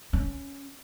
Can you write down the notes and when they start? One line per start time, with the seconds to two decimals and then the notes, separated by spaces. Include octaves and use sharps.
0.13 C#4